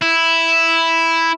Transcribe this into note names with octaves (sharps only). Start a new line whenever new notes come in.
E4